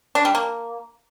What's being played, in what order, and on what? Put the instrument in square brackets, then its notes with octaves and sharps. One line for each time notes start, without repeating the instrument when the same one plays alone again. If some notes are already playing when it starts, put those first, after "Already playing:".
[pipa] D4
G3
A#3